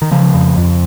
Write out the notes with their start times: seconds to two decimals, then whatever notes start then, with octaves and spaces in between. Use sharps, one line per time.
0.02 D#3
0.12 C#3 F3
0.34 F2
0.57 F2